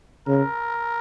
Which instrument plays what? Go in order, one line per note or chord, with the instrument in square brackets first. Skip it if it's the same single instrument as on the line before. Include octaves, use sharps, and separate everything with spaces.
[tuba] C#3 [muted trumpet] A#4